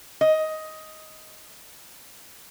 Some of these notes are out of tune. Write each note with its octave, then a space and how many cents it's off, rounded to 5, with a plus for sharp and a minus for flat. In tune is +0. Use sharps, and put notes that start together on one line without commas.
D#5 +10